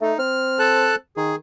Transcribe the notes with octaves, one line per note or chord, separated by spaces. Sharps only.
A3 D#4
C4 F6
A4 A5 F#6
D#3 G#4